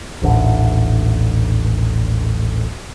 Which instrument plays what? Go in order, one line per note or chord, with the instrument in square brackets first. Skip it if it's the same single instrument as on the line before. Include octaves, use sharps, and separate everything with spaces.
[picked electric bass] D#1 A1 D3